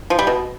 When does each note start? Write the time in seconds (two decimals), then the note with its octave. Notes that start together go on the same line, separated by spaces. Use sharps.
0.10 F3
0.19 G3
0.27 B2